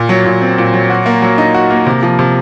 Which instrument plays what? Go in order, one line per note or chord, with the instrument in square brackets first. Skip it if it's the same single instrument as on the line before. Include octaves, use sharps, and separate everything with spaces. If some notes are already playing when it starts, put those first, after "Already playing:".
Already playing: [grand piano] A#2
F#3
A#2
C4
A#2
F#3
F#4
A#3
F#3
D#4
F#4
A#3
C3
F3
C3